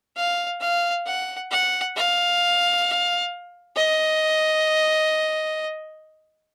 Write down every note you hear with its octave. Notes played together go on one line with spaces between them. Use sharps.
F5
F5
F#5
F#5
F5
D#5